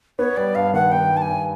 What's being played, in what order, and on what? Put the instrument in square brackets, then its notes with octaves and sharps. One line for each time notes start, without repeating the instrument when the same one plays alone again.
[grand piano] B3 [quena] C#5
[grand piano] G3 [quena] D5
[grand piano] G2 [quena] F5
[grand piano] D#3 [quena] F#5
[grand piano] B3 [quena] G5
[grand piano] G3
[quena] A5
G#5
[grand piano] G2